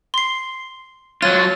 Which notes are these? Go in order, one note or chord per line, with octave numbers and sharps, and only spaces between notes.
C6 C7
F#3 F4 C#5 A6 D#7